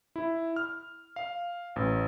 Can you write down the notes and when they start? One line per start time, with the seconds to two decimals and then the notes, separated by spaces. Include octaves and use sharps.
0.16 E4
0.56 F6
1.16 F5
1.76 A1